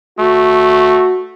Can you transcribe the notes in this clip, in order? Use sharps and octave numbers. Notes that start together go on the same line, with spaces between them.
A3 F#4